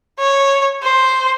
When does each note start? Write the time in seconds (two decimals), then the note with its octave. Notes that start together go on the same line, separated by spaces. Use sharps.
0.19 C#5
0.83 C5